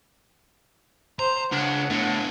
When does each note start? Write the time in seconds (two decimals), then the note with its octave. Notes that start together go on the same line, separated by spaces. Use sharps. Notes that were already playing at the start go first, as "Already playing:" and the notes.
1.19 C5 A#5
1.52 C#2 C#3 D4 F#5
1.90 A2 B3 D4